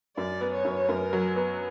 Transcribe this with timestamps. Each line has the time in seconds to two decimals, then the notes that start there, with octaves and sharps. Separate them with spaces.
0.17 F#2 D5
0.41 B3
0.53 C#5
0.65 F#2
0.89 F#2 A#4
1.13 F#3
1.36 B3